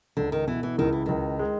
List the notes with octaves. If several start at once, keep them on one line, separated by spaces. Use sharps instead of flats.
C#2 D3
D#3
B2 E3
E3
C#2 D#3
E3
C#2 D#3
G#3